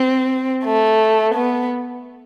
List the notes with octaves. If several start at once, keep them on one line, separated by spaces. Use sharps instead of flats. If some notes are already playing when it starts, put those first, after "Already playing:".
Already playing: C4
A3
B3